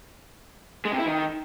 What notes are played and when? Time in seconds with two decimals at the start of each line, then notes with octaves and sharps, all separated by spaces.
0.85 G#3
0.92 C3
0.99 E4
1.06 D#3